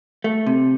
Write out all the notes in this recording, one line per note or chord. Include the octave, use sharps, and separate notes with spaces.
A3
C3